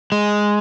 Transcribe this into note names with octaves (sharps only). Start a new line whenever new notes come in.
G#3